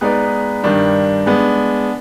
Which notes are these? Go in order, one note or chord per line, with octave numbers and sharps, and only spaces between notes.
G#3 B3 D#4 B4 D5
G2 D#3 G3 D4
G#3 B3 D4